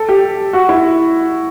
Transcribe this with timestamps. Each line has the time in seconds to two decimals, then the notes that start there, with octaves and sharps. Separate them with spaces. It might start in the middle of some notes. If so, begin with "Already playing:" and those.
Already playing: A4
0.09 G4
0.53 F#4
0.69 E4